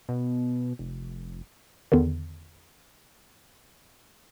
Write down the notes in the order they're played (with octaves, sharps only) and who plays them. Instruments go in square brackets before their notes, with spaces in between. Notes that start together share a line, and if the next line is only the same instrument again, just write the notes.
[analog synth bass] B2
F1
[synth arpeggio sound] E2 D3 D#3